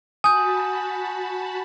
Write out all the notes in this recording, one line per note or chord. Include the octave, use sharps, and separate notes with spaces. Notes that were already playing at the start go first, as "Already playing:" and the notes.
F#4 G#5 A5 B5 D#6 G6